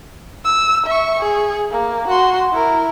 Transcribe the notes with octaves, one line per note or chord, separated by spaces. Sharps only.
E6
E5 C#6
G#4
A#3
F#4 C6
E4 A#4